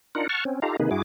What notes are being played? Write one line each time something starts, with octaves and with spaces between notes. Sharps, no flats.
D4 D#4 F4 A#4 F#5
F#5 A5 C#6 F6
C4 C#4
D#4 F4 G4 A4 F5 A#5
C3 D#3 A#3 D#4 G#4 B4
G2 E4 F#4 G#4 D6